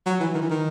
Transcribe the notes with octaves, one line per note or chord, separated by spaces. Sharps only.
F#3
E3
D#3
E3
D#3